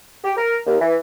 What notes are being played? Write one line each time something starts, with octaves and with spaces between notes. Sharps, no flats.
G4
A#4
D#2
E3